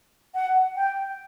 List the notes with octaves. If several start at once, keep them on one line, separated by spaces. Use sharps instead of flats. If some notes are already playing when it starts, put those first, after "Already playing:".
F#5
G5